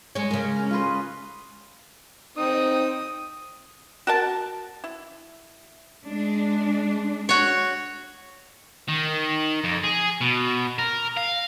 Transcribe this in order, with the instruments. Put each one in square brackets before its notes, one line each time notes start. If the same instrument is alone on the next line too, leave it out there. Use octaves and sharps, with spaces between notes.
[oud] G#3 C#5 [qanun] D#5
[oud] C#3 G#3 [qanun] A#4
[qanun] C#4 A#5
F4 B4 D#5
[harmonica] C4 D#4 [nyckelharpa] D#6
[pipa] F#4 A#4 A5
E4
[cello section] G#3 D4
[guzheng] F#4 C#5
[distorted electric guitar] D#3
F2
G#4
B2
A#4
F5